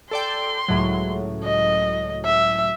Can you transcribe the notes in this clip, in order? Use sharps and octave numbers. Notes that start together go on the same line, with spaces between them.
A4 D5 G5 C6
C#2 A2 F#3
D#5
E5